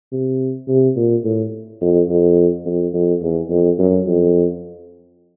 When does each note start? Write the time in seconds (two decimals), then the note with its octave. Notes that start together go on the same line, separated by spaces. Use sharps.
0.12 C3
0.68 C3
0.96 A#2
1.24 A2
1.81 F2
2.09 F2
2.66 F2
2.94 F2
3.22 E2
3.50 F2
3.79 F#2
4.07 F2